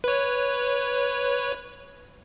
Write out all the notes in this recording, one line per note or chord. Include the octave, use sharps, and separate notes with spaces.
B4 C#5